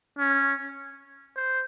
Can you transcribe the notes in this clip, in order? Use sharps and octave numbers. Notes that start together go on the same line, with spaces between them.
C#4
C5